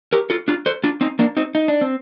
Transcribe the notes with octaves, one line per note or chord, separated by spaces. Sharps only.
G4 A#4
F4 A4
D4 F4
A4 C5
D4 F4
C4 D#4
A#3 D4
C4 D#4
D#4
D4
C4